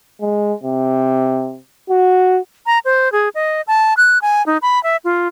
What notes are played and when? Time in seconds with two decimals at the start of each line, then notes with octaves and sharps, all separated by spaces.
0.21 G#3
0.64 C3
1.90 F#4
2.66 A#5
2.85 C5
3.12 G#4
3.35 D#5
3.67 A5
3.97 F#6
4.22 G#5
4.46 D#4
4.62 B5
4.83 E5
5.05 F4